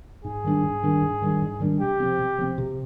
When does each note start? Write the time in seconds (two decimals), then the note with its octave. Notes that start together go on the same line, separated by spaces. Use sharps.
0.24 G#2 G#4
0.44 D#3 G3 D4
0.63 G#2
0.83 D#3 G3 D4
1.02 G#2
1.22 D#3 G3 D4
1.42 G#2
1.60 D#3 G3 D4
1.80 C3 G4
2.00 F3 C4
2.19 C3
2.38 F3 C4
2.58 C3